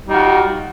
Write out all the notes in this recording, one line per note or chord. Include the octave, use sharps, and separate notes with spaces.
G3 D#4 F4 F#4